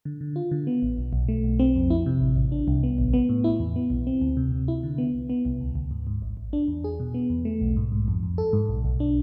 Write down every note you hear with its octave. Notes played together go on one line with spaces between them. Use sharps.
D3
D3
F4
D3
B3
A1
B1
B1
A3
B1
C4
F2
E4
C3
A1
A1
D4
C2
B3
A1
B3
A2
E4
E2
B3
B1
C4
D2
C3
C3
E4
D3
B3
C2
B3
C2
D2
D2
G#2
G#2
A1
A1
D4
E2
G#4
B2
B3
E2
A3
B1
G#2
G#2
F2
F2
A4
G#2
B1
B1
D4